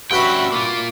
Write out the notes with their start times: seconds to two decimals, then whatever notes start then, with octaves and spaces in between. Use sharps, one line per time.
0.11 G2 C#4 F#4 B4 E5 G5 B5 F#6
0.52 A#3 F4 D6